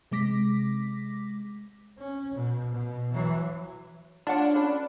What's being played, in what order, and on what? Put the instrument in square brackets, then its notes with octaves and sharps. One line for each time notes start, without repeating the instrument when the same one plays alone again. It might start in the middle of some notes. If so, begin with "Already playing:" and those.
[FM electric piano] C3 G#3 D6 A#6 B6
[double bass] C#4
B2
B2
E3 F#3
[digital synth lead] D4 [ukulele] F4 C#5 F#5
[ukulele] C#4 B4 B5